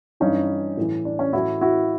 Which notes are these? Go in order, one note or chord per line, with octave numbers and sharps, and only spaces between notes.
G2 E3 C#4 D#4
A2 E3
D4
C#4
A2 E3 E4 F#4
E4 F#4